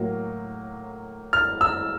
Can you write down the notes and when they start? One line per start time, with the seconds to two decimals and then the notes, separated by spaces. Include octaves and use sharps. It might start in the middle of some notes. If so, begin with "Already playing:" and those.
Already playing: A2 F#3 A#3
1.33 F6
1.61 E6